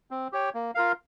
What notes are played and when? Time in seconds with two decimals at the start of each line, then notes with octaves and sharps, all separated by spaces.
0.11 C4
0.32 G4 C#5 G5
0.54 A#3
0.75 F4 A#4 F5